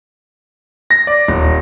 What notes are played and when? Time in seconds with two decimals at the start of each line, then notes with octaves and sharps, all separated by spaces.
0.91 A#6
1.07 D5
1.28 D#1